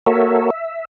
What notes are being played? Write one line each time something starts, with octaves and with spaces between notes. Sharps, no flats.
A#3 F#4 A4 A#4 C#5 E5
E5